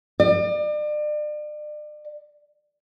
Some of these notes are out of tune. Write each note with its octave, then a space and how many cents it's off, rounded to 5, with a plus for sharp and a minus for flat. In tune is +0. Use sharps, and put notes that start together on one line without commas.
D5 +40